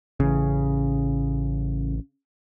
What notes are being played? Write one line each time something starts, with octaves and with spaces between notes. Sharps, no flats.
A1 C#3